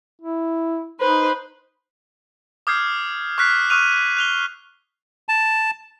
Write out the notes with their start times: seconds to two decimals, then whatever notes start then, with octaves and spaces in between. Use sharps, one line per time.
0.22 E4
1.01 D#4 B4 C5
2.67 D6 D#6 F6 G6 G#6 C7
3.38 C#6 F6 F#6 B6 C7
3.70 C#6 D#6 F6 F#6 D#7 F7
4.17 F#6 F7 G7
5.29 A5